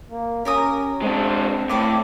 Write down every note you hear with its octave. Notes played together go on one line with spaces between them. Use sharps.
A#3
C#4 G4 A#4 D#6
G#3 C4 D4
A2 B4 D5 D6